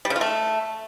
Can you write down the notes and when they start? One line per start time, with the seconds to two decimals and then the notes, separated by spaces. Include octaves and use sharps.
0.05 G3
0.10 C#3
0.16 F4
0.21 A3